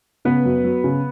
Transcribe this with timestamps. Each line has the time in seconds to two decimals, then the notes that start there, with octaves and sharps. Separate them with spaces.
0.25 C#3 B3 B4
0.45 F#2
0.64 F#3
0.84 C#3